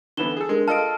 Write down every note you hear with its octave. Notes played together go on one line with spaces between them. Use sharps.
D3 E3 B3 D4 E7 G7
G#4 A4
G#3 D4 A#4
F4 A4 D#5 A5 F6 D7